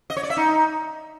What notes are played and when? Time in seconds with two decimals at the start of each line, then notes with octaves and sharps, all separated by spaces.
0.10 D#5
0.16 C#5
0.23 D5
0.30 E5
0.37 D#4